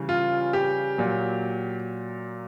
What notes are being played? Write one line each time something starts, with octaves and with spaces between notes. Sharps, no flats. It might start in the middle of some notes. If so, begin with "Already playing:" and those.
Already playing: C#3 E3 G3
F4
G4
A#2 F#3